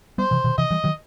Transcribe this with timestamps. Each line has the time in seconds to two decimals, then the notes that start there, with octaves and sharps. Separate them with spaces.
0.18 G3 B3 C5
0.31 C3 E3
0.44 B2 D#3
0.58 C3 E3 D#5
0.71 E3 G3
0.84 D#3 F#3